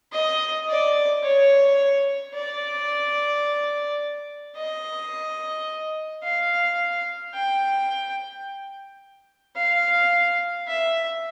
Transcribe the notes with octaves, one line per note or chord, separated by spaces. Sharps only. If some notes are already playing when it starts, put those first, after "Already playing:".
D#5
D5
C#5
D5
D#5
F5
G5
F5
E5